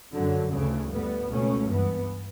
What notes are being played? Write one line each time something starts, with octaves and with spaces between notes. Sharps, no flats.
F#2 D3 F#3
D2 C#3 E3 A3
A2 G3 B3
C#2 B2 A3 C#4
G2 E3 B3